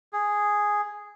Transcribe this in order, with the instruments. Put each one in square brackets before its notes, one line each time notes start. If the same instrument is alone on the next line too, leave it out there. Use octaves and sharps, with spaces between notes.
[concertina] G#4